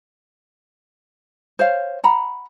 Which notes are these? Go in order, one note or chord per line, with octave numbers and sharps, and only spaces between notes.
C5 C#5 F5
F#5 A#5 B5